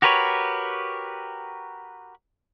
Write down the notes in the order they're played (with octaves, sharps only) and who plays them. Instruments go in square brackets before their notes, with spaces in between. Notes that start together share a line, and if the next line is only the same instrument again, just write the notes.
[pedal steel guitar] F#4 G4 A#4 B4 C#5